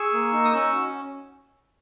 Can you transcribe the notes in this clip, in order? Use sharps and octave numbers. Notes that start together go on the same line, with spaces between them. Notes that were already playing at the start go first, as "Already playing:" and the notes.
Already playing: G#4 C#6 E6
A#3
D#4
D#6
C#4 C#6 E6
F#4